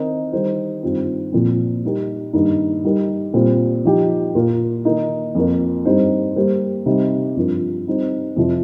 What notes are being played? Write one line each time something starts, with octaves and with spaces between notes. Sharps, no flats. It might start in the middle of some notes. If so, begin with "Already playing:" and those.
Already playing: D#3 C4 D#4 A#4
D#3 G3 D#4 C5
G2 D#3 C4 F4 C5
A#2 F3 C4
G3 D#4 G4 A#4
G2 D#3 A#3 D#4
G3 D#4 G4 A#4
A#2 G3 C4 F4 C5
F3 D#4 G4
A#2 A#3 F4
D#3 A#3 D#4
F2 F3 A#3
G2 G3 C4 D#4 C5
G3 A#3 G4 C5
C3 G3 D#4 C5
G2 F3 C4 F4 A#4
G3 C4 D#4 C5
F2 C3 F3